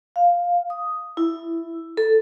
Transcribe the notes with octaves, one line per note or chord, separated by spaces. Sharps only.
F5
D#6
E4
A4